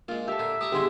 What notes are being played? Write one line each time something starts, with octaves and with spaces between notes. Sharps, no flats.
A#2 G#3 F4
G4 A4 E5
A#2 D3
G4 A5 A#5 D#6
G2 B2 D3 G#3 D4 E4 G4 G#4